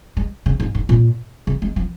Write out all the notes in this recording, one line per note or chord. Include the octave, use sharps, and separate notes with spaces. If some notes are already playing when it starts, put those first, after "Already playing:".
G#3
C#3
G#2
G#2
A#2
C#3
G#3
F3